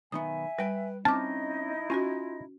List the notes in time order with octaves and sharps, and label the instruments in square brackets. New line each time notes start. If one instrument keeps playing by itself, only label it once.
[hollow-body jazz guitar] B1 D#3 B3 [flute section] E5 G#5 [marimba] D#6
[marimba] G3 [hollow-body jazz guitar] B4 G5
[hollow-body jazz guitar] C4 C#4 [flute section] D#4 E4 D#5 [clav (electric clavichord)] A5 [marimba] D6 F6
[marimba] C#4 F#4 [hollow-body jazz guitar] F4 G#5